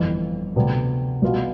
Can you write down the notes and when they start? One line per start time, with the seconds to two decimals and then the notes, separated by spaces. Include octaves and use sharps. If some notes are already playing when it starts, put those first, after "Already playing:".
Already playing: G1 F2 E3
0.55 D2 C3 G3 B3
1.22 C2 B2 B3 F4